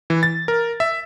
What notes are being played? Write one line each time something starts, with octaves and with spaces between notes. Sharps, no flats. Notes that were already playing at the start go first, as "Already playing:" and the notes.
E3
A6
A#4
E5